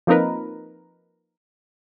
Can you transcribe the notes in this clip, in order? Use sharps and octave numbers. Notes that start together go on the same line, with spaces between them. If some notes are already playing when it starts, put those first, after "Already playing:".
F3 A#3 C4 D#4 A#4 B4